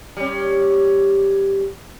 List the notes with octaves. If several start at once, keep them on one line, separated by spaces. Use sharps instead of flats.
G3 C#4